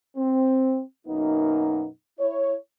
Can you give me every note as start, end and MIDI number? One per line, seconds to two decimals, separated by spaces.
0.16 0.81 60
1.07 1.86 42
1.07 1.86 47
1.07 1.86 58
1.07 1.86 59
1.07 1.86 63
2.19 2.55 64
2.19 2.55 73